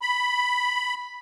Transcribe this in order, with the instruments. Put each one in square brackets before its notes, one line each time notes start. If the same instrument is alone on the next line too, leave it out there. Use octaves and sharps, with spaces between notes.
[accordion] B5